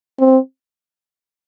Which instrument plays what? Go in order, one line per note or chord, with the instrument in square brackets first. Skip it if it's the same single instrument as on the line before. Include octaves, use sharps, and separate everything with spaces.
[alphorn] C4